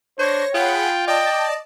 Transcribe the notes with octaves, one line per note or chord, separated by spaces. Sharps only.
D4 C5 C#5 C#6 A#6
F4 G#4 F#5 G5 B5
D5 D#5 G5 A5